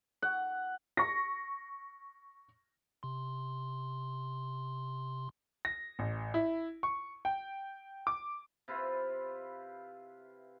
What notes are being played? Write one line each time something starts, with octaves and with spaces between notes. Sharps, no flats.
F#5
C#6 A#6
C3 C6
A#6
A1
E4
C#6
G5
D6
C3 E4 F4 B4